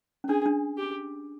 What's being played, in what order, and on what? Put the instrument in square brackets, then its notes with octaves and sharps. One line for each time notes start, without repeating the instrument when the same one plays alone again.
[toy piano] C#4
[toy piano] D4 [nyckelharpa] G#4
[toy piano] D4
[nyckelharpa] G4